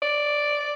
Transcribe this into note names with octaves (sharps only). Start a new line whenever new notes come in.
D5